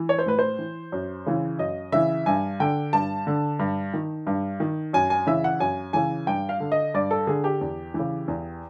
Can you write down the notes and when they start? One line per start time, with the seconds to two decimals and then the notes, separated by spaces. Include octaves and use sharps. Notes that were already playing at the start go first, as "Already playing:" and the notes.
Already playing: E3
0.09 C#5
0.19 C5
0.26 A2 B4
0.39 C5
0.59 E3
0.92 F#2
1.26 C#3 E3
1.59 F#2 D#5
1.92 C#3 E3 E5
2.26 G2 G#5
2.60 D3 G5
2.93 G2 A5
3.27 D3
3.59 G2
3.94 D#3
4.27 G2
4.60 D#3
4.93 F#2 G#5
5.10 G#5
5.27 C#3 E3 E5
5.44 F#5
5.60 F#2 G#5
5.93 C#3 E3 G#5
6.27 G2 G5
6.49 F5
6.60 D3
6.72 D#5
6.94 G2 D5
7.11 A4
7.27 D3 G#4
7.44 G4
7.61 E2
7.94 E3
7.99 C#3
8.28 E2